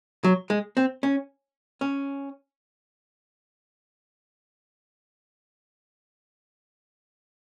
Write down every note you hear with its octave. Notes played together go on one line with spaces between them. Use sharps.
F#3
G#3
C4
C#4
C#4